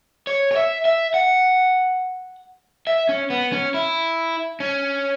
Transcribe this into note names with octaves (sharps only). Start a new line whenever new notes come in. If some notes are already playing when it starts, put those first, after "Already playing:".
C#5
C#5
E5
E5
F#5
E5
C#4
B3
C#4
E4
C#4